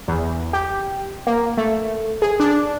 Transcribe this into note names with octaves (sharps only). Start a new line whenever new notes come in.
E2
G4
A#3
A3
G#4
D4